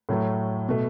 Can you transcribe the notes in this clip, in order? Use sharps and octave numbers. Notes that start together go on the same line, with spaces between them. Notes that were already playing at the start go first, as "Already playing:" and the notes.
A2 F#3 A3
B2 A3